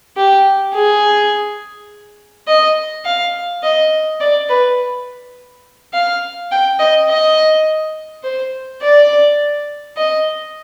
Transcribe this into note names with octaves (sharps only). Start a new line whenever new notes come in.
G4
G#4
D#5
F5
D#5
D5
B4
F5
G5
D#5
D#5
C5
D5
D#5